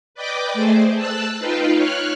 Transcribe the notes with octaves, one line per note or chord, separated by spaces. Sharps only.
B4 D5 D#5 G5 D6
A3 G#4 C5
A5 E6 F#6
D#4 F4 B4 F5 G5
C#5 F6 F#6